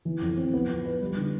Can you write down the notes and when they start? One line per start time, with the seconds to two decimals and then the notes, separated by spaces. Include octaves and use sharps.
0.05 E3
0.22 F2
0.37 C4
0.54 B3
0.69 F3
0.85 B4
1.01 G3
1.17 D3